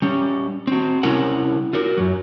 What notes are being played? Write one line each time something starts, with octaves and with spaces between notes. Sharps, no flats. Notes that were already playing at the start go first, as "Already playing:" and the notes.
G3 C#4
C4 F#4
C3 G3 C#4 E4 A#4 F#5
F4 F#4 A#4
F#2 F#3